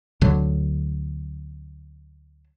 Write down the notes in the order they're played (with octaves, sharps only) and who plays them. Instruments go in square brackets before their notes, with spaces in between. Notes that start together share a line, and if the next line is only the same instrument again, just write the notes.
[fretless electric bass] D2 D3 F#3